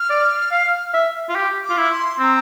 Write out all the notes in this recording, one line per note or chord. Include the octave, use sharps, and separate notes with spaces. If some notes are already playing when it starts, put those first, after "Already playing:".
Already playing: F6
D5
F5
E5
F4
G4
D6
F4
E4
C6
C4 A#5 C6